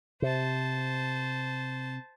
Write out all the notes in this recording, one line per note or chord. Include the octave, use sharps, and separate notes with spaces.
C3 C5 A5